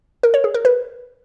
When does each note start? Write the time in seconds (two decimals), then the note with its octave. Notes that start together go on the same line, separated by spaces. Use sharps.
0.23 A#4
0.34 C#5
0.44 G#4
0.54 A#4
0.65 B4